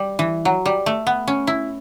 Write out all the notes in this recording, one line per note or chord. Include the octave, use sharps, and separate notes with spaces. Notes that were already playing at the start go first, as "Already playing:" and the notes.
Already playing: G3
E3
F#3
G3
A3
B3
C#4
E4